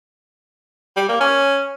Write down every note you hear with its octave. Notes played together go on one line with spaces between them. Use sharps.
G3
A#3
C#4